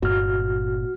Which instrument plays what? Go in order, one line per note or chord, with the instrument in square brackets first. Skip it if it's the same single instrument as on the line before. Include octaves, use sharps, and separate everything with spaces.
[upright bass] G1 A#2 [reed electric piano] F#4 F6